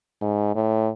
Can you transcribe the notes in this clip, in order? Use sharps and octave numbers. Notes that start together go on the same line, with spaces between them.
G#2
A2